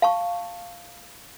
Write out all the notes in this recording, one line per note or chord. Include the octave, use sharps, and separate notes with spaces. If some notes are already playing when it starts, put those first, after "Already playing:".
F5 A5 C#6